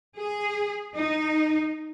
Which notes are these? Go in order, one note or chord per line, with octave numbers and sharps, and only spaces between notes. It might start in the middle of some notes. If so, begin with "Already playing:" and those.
G#4
D#4